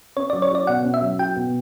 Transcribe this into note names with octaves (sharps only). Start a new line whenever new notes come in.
C#4 C#5
D5
F#3
C#5
F#4 D5
B2 F#5
C#4
E5
F#3
F#4 G5
B2